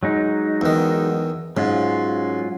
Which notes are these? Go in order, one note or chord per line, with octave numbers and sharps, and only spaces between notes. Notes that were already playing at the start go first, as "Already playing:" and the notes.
F#3 G#3 D#4
E2 D#3
G#2 F#3 C#4 F4